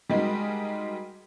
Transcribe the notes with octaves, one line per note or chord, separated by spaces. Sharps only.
G3 G#3 D#4 F#4 A#4